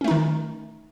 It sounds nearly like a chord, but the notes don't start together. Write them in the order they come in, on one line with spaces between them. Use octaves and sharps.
C#4 A3 D#4 D#3